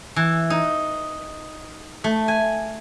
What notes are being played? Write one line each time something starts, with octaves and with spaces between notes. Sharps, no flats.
E3
D#4
A3
G#5